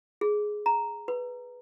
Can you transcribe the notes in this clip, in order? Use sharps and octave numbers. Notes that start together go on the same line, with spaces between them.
G#4
A#5
B4